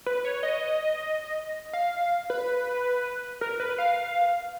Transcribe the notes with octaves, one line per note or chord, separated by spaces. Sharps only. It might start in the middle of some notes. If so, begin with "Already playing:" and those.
B4
C#5
D#5
F5
B4
A#4
B4
F5